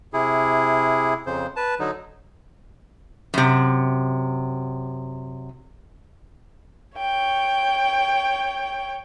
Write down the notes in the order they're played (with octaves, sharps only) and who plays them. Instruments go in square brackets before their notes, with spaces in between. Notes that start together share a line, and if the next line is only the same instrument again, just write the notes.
[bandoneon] C3 E4 G#4
F2 C#3 C5
B4 A5
D3 F#3 D#4
[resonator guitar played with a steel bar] F#2 C3
[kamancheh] C#5 G5